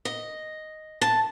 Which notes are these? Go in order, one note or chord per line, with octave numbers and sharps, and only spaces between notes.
D#5
A5